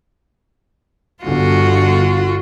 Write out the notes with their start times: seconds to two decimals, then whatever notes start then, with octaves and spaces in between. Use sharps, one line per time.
1.23 G1 D3 F4 F#4